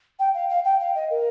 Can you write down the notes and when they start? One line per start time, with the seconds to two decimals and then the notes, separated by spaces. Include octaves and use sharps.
0.19 G5
0.34 F5
0.50 F5
0.65 G5
0.80 F5
0.95 D#5
1.11 A#4